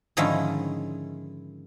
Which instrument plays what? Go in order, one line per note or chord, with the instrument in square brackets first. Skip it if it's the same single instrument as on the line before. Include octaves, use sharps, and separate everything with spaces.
[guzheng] G#2 D3 D#3 F3 C#4 E4